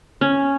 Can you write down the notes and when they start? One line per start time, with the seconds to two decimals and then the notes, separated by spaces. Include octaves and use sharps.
0.21 C#4